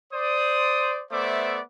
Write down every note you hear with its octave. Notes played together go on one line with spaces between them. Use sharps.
C5 D5 D#6
A3 B3 C5 D5 E5 D6